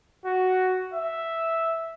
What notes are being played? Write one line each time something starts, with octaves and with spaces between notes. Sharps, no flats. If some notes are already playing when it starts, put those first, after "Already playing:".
F#4
E5